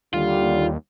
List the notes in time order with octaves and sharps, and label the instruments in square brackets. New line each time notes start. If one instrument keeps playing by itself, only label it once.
[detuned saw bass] D#2 [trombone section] D3 G3 [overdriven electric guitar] F4